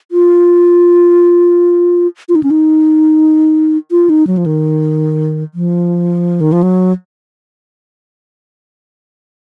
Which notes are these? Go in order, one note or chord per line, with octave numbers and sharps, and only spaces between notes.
F4
F4
D#4
C#4
D#4
F4
D#4
F#3
F3
D#3
F3
D#3
F3
F#3